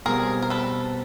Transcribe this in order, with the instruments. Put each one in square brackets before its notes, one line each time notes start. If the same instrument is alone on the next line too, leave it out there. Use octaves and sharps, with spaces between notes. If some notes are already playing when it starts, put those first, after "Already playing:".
[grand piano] B2 G3 C4 [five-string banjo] G#4 A#4
[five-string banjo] A#4
A4 B4